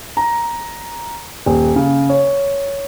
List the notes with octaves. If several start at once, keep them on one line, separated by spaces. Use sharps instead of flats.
A#5
D#1
C#3
C#5